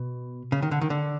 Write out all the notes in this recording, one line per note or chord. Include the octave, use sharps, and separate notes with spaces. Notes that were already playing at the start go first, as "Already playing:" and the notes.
Already playing: B2
C#3
D#3
D3
D#3
D3